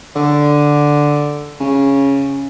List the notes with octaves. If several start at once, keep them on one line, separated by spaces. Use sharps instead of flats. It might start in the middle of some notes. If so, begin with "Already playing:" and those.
D3
C#3